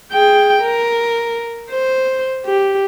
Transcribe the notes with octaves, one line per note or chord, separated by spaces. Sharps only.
G#4 G5
A#4
C5
G4